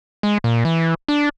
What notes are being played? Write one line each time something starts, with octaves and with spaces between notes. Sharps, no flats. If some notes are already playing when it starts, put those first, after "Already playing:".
G#3
A#2
E3
D4